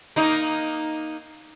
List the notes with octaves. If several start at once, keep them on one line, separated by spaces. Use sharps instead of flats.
A#3 D#4